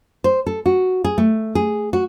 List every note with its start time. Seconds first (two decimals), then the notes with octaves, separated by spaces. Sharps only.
0.24 C5
0.47 A4
0.66 F#4
1.04 G#4
1.18 A3
1.55 G#4
1.93 F#4